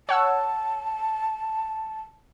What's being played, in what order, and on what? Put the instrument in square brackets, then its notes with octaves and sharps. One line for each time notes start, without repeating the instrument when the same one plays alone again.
[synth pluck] C#5 F#5 E6 [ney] A5